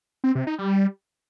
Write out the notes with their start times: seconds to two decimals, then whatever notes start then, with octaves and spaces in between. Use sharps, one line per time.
0.24 C4
0.35 C3
0.47 D#4
0.59 G3